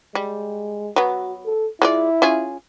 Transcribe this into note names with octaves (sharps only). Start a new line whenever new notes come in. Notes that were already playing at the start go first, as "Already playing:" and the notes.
G3 G#3
F#3 B3 F#4
A4
G#3 E4 F4 D5
C#4 F4 G#4